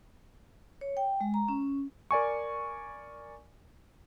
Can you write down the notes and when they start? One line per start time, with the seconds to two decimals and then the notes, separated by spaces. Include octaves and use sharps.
0.81 C#5
0.97 G5
1.21 G#3
1.34 A#5
1.49 C#4
2.11 A#4 D5 G#5 C#6